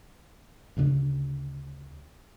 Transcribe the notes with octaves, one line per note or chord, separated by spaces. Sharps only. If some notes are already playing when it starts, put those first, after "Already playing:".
D2 C#3 G#3 D4